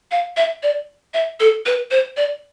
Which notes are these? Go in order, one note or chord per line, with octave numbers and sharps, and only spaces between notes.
F5
E5
D5
E5
A4
B4
C5
D5